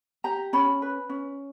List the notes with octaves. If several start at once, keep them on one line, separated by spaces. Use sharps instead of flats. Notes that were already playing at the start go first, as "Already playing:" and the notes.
G4 A#5
C#4 B5
B4
C#4